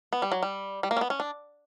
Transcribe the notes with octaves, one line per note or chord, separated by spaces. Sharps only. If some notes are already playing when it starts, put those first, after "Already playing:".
B3
G3
F#3
G3
G3
A#3
C#4
B3
C#4
D4